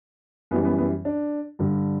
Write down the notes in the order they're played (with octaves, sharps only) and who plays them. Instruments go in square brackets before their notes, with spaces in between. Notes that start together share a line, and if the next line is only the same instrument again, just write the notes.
[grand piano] F#2 E3 G3 B3
B3
B3
D4
G2 D3 G3